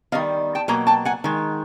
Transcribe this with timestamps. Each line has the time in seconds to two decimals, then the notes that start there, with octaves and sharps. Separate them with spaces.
0.12 D#3 G3 B3 D#5 F5
0.55 G5 A5
0.68 B2 F#3 A#3 G#5 A#5
0.87 G5 A5
1.05 F#5 G#5
1.24 D#3 G#3